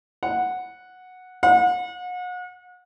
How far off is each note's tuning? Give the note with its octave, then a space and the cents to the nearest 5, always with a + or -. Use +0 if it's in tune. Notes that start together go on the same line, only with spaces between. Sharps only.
F#5 -10
F#5 -40